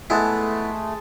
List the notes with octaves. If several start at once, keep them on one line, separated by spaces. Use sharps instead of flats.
G#3 A3 B3 E4 G#4 A5